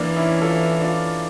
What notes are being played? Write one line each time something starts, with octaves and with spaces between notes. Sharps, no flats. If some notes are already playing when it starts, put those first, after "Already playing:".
Already playing: E3 A#3 D4
C#4 E4
F4 A4
D4 F4